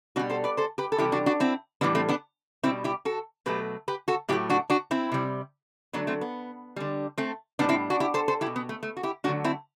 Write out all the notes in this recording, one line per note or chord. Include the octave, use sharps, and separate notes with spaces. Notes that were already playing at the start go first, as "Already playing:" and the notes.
B2 G3 D4 F#4
A4 C5
B4 D5
A4 C5
G4 B4
A4
C3 E3 G3 E4 G4
D4 F#4
D4 F#4
C4 E4
A2 E3 G3 B3 D4
A3 C4
B3 D4
B2 G3 C4 E4
E4 G4
F#4 A4
B2 F#3 A3 G4 B4
G4 B4
F#4 A4
A2 F#3 A3 E4 G4
D4 F#4
D4 F#4
C4 E4
C3 G3
D3 F#3 A3 B3 D4
A3 C4
B3
D3 G3
A3 C4
A2 G3 B3 D4
C4 E4
D4 F#4
E4 G4
A4 C5
A4 C5
G3 E4 G4
B2
B3
A3
A3
F#4
E4 G4
D3 F#3 A3 D4 F#4
C4 E4